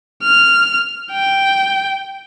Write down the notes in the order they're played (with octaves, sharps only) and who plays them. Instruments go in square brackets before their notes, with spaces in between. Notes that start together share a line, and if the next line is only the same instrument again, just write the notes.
[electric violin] F6
G5